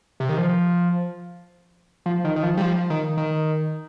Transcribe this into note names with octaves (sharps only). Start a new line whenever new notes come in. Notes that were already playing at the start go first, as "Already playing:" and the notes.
C3
D#3
F3
F3
D#3
D#3
F3
G3
F3
D#3
D#3